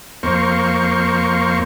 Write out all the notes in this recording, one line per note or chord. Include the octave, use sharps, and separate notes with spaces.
F2 A#3 C5 C#6